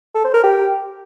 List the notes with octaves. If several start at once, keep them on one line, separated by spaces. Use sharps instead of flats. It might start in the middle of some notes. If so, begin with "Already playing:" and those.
A4
C5
A#4
G4